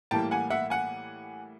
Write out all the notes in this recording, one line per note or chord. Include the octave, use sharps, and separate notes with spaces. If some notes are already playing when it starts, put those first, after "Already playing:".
A2 E3 G3 A#3 G5 A5
F#5 G#5
E5 F#5
F#5 G#5